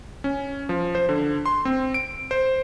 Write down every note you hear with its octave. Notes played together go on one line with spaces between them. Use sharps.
C#4
F3
C5
D3
C6
C4
D7
C5